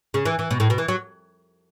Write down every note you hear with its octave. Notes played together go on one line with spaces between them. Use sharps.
C#3
E3
E3
B2
A2
B2
E3
F#3